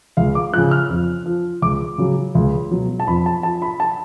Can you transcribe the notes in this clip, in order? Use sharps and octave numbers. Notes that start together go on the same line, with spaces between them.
C#2 F5
D6
C#3 F3 F#6
F6
F2
F3
C#2 D6
C#3 F#3
C#2
B2 F#3
A5
F2 B5
A5
F3 A5
B5
A5